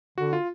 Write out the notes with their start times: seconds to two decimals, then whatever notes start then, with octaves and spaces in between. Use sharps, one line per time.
0.18 D3 F#4
0.33 F4